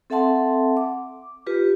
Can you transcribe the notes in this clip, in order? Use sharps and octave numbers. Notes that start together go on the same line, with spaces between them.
C4 A4 E5 F#5 A5 C6
D6
F4 G4 B4